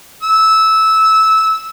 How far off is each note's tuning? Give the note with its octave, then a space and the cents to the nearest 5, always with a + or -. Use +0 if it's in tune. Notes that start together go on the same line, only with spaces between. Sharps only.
E6 -15